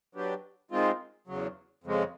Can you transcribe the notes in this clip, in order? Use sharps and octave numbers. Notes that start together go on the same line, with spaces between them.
F#3 B3 D4 G4
D#3 G#3 C4 F4
E2 C#3 F#3
F2 C#3 F3 G#3